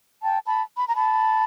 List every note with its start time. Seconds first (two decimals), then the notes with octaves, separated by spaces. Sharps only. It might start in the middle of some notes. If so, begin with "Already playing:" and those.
0.23 G5 A5
0.45 A5 B5
0.76 B5
0.86 A#5
0.95 A5 B5